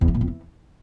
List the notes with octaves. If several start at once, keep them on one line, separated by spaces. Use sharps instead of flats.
E2
E3
A#2
F2
E3